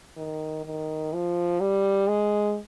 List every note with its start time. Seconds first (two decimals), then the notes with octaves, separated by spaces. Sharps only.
0.17 D#3
0.65 D#3
1.13 F3
1.60 G3
2.08 G#3